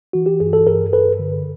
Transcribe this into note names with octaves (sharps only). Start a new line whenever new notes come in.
E3 F#4
G4
G2 G#4
A4
G2 G#4 A#4
G2 A4 B4
D3